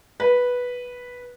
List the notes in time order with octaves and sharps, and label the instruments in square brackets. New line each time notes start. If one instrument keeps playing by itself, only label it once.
[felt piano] B4